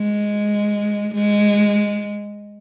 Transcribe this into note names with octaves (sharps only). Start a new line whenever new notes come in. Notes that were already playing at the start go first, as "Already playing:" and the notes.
Already playing: G#3
G#3